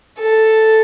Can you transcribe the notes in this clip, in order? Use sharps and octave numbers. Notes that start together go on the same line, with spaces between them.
A4